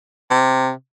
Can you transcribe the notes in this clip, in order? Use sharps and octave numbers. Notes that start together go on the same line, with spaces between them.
C3